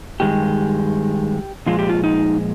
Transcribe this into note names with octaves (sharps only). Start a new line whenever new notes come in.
G2 D#3 G#3 G4
A#2 F3 G#3 F4
G4
F4
D#4